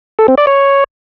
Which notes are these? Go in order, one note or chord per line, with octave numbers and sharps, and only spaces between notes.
A4
C4
D5
C#5